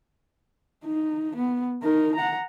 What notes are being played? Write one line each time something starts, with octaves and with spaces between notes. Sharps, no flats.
D#4
B3
D#4 A#4
F#5 A#5